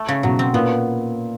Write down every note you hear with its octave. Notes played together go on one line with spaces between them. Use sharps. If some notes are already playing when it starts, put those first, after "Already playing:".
Already playing: A3
C#3
B2 F#3
C4
A#2 B3